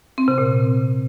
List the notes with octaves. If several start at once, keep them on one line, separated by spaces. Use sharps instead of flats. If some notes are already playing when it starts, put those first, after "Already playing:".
C4
C3
A#2